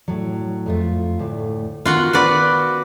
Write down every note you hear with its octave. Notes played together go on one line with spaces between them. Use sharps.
A2 F#3
F2 A3 F4
D2 A2
D#3 B3 F4 F#4 F#5
F#4 B4 D5